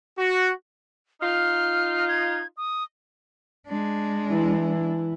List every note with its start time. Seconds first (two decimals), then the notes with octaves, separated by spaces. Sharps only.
0.18 F#4
1.21 D#4 F4 F6
2.08 G#6
2.57 D#6
3.68 G#3 D4
4.27 E3 E4